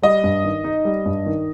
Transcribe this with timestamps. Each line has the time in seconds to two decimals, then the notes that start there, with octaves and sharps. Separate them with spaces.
0.02 G3 D#5
0.24 G2
0.44 D#3
0.64 D#4
0.85 G3
1.06 G2
1.26 D#3